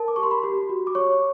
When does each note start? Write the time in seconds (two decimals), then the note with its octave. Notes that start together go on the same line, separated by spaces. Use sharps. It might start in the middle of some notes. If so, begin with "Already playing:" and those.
Already playing: A#4 A5
0.08 D6
0.16 G4 C#6
0.23 C6
0.31 B5
0.44 G4
0.70 F#4
0.87 D6
0.95 C#5 C#6